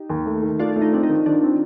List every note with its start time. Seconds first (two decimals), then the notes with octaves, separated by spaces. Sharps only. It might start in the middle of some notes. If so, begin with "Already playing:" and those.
Already playing: D#4 G4
0.10 D#2
0.26 A3
0.43 D#3
0.59 A3 D4 F4
0.76 A3
0.82 D#4
0.93 C4 D4
1.03 D#4
1.09 D#3
1.26 D#3 D4
1.43 C4